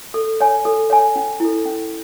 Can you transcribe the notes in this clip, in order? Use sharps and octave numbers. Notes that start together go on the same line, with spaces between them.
A4
C#5 G#5
A4
C#5 G#5
C#4
E4 A4
C#4